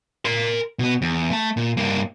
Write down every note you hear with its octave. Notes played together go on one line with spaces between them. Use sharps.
A#4 C6
B2 B3
E2
A3 A5
A#2
G2 A#3